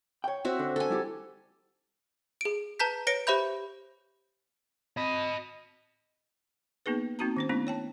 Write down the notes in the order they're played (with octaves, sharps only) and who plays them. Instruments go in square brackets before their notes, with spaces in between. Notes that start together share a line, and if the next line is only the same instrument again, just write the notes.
[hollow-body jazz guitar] C#5 G5
[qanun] C4 F#4 E5
[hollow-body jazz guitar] D3
[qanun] A4 G#5
[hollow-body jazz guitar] G3 E4 G4
[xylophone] G#4 D7
B4 A5 A#5 G6 B6
B4 C#5 A#6 C#7 D7
G4 C5 E5 B5 G6
[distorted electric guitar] D#5 B5
[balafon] A#3 B3 D#4 G#4 B4
A#3 C4 D#4 F#4 A5 A#5
D#3 C#4 C5
A3 B3 C#4 D4 E4
C#5 G5 A5